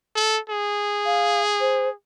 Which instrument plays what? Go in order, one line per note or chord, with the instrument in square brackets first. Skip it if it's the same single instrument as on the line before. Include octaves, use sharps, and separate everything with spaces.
[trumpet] A4
G#4
[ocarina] F5
C5